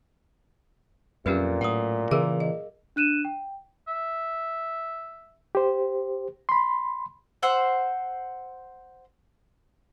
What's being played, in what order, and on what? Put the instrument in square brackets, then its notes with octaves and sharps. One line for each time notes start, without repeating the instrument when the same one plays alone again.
[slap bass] F2 [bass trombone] A#2 [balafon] F#3 C#4 G4 [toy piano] B4
[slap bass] A2 [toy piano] F#5 D#6
[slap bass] C#3 E3 [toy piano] G#4 A#4 [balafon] E5 F5
[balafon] D#5
[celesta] D4 F#6 D#7 E7
G5
[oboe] E5
[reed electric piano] G4 C5
B5 C6
[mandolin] C5 F#5 E6